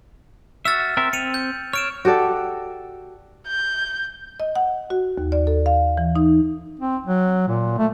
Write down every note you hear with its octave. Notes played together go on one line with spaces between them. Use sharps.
F#4 E5 E6 F6 A6
C4 A#4 E5
C4 C#7 D#7 F7
G6
C#5 F6 D7 E7
F#4 G4 A4 D5
G6
D#5
F#5
F#4
D#2
D5
A4
F5
E3
D#4
C4
F#3
A#2
A3